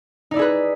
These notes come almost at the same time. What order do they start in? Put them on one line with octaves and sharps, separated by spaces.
D#4 D5 E4 G#4 B4